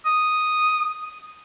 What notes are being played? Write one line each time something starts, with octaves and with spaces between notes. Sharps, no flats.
D#6